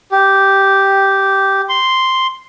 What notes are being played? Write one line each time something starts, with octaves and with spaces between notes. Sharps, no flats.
G4
C6